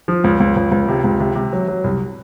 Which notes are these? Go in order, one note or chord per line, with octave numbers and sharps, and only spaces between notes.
F3
C#2
C#2
C#2
C#2
C3
C#2
C3
C3
F#3
F#3
C2